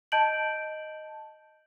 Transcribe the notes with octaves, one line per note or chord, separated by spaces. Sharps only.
D#5 A5 G6 D7 F#7